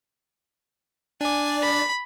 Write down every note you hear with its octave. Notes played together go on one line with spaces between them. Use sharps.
D4 D5 G#5
B5